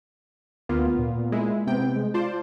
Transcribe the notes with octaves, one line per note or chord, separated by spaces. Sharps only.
D2 A#3 B3 F4
A#2
G#3 E4
C3 B3 G5
G#3
F4 C5 D5 A5